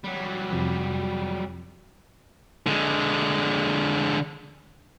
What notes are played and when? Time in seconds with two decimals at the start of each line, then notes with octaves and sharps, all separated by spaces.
0.04 F#3 G3
0.51 F2 C3 F3
2.67 D3 G#3